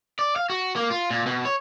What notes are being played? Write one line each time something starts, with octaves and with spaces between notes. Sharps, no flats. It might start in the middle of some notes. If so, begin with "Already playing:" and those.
D5
F5
F#4
A#3
F4
A#2
B2
C#5